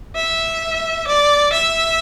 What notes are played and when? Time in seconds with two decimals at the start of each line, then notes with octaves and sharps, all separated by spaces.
0.16 E5
1.07 D5
1.53 E5